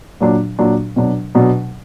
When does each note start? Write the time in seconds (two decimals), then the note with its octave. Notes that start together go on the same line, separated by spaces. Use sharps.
0.21 A#2 F#3 D4
0.59 A#2 F#3 D4
0.96 B2 F#3 D4
1.35 B2 F#3 D4